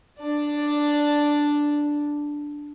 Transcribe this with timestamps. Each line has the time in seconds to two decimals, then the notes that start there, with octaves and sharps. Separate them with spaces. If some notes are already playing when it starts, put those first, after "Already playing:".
0.19 D4 D5